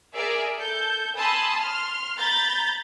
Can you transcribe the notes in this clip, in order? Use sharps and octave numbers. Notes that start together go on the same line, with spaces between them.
G#4 A#4 D5 E5
A4 G6
G#5 A5 B5 C6 D#6 E6
C6 F6
A#5 B5 G6 A6